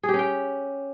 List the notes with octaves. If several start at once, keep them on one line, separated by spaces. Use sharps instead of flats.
G#4
G4
C#4
G5